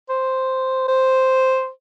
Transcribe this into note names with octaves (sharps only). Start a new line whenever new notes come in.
C5
C5